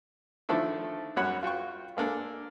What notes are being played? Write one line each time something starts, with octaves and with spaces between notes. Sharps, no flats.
D3 D#3 F3 A3 D4 E4
F#2 G3 F#4 C#5 F#5 B5
F4 F#4 G5 C#6
G#3 A#3 D4 A4